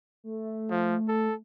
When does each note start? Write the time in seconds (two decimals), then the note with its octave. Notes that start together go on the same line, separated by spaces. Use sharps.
0.24 A3
0.70 F3
1.08 A4